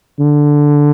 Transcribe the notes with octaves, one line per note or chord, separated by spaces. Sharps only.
D3